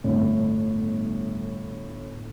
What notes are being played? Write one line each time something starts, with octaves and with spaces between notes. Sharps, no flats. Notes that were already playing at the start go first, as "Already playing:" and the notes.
G1 A2